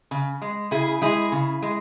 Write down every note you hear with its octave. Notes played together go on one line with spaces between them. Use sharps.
C#3
G#3
C#3 E4 G#4
G#3 E4 G#4
C#3
G#3